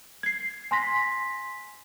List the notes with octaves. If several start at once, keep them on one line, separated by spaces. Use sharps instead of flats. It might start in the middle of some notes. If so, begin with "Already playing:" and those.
G#6 C7
G#5 C6 A#6 B6